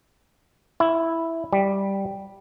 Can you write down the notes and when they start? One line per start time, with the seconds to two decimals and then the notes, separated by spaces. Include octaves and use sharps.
0.80 E4
1.53 G3